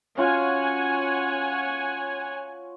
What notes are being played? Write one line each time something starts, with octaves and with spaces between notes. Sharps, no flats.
C#4 F4 F#4 C#5 F#5 G#5